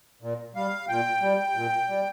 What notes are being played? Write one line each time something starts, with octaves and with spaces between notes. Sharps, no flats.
A#2
G3 F5
A#2 G5
G3
A#2
G3